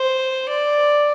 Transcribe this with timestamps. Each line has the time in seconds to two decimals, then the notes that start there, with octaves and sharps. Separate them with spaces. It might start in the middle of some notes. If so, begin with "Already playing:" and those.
Already playing: C5
0.49 D5